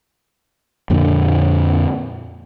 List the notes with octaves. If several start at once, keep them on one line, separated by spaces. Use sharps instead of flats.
F2 A#2 D3